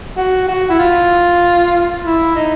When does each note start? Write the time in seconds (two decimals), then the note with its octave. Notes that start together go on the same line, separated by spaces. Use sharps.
0.17 F#4
0.48 F#4
0.70 E4
0.79 F4
2.04 E4
2.35 D#4